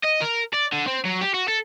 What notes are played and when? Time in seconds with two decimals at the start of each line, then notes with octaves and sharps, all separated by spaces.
0.04 D#5
0.22 A#4
0.54 D5
0.73 D3
0.87 C4
1.05 F#3
1.21 G4
1.34 F#4
1.49 A4